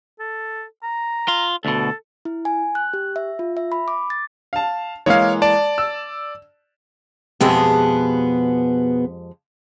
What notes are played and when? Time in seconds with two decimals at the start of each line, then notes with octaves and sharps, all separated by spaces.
0.19 A4
0.83 A#5
1.28 F4
1.65 D2 B2 A4
2.25 E4
2.45 G#5
2.75 F#6
2.94 G4
3.16 E5
3.39 F4
3.57 E5
3.72 B5
3.88 D6
4.10 A6
4.53 F5 A5
5.06 E3 G#3 A#3 C#5 F5
5.42 D5 A5
5.78 E6
7.41 F2 B2 G#3 B3 G4 G#4